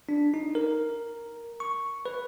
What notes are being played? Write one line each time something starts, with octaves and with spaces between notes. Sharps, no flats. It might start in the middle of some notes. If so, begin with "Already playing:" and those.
D4
D#4
A#4
C#6
B4